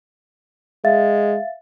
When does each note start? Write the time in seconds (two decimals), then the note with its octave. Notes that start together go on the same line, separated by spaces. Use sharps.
0.85 G#3 E5 F5 A6